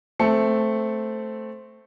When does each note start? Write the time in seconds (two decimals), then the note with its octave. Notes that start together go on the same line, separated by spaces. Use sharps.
0.19 A3 C4 A5 C#7